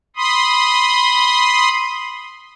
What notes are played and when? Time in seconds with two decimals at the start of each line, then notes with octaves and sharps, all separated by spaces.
0.16 B5 C6 D#6